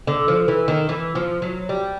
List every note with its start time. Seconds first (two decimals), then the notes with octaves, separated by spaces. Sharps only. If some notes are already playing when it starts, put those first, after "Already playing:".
0.07 D3
0.28 F3
0.48 E3
0.68 D#3
0.89 E3
1.15 F3
1.42 F#3
1.69 G3